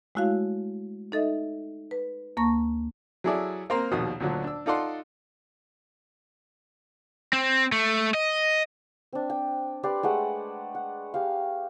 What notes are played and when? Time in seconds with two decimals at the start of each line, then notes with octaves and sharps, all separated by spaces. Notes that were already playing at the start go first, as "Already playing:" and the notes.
0.15 G#3 A3 E4 F#4 C#5 F5
1.12 D#4 A4 D#5 E5
1.91 B4
2.37 D2 A#3 A5 C#6 A#6
3.24 F#3 E4 G#4 A4 D5 E5
3.70 A#3 C4 A#4 A#5 C6
3.92 A#1 D#2 B2 D#6
4.20 D2 A#2 D3 F#3
4.44 D4 E6
4.66 D#4 F4 A4 D5 F#5 C6
7.33 C4
7.72 A3
8.14 D#5
9.13 C4 D4
9.30 G5
9.83 G4 B4 D5 C6
10.03 G#3 A3 F#5 G5
10.75 F#5
11.14 G4 F5